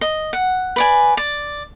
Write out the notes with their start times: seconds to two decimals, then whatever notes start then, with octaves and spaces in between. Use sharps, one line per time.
0.01 D#5
0.33 F#5
0.76 B4 D5 G#5
1.17 D5